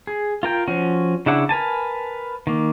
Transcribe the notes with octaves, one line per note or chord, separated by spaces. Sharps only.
G#4
F4 A#4 G5
F3 C#4 F#4
C#3 D4 E4 F#5
A#4 B4 G#5 A5
D#3 A#3